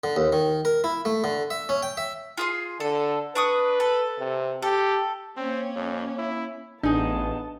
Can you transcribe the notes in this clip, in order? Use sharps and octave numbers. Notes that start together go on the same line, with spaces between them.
D3
D#2
D#3
A#4
E4
A3
D3
E5
C#4
G5
E5
F4 G#4 C6
D3 A4
D4 B4 C#6 D#6
A4
C3
G4 A4
A#3 C4 C#4
F2
E4
A1 B3 D4 D#4 G#4 A5